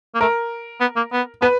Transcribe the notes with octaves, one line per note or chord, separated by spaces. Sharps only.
A#3
A3 A#4
B3
A#3
B3
B3 B4